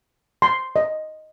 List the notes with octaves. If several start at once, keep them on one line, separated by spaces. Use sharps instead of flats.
C6
D#5